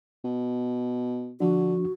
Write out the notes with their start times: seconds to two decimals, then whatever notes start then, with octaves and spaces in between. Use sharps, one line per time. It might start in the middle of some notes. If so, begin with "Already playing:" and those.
0.24 B2
1.40 D3 F3 D4 F#4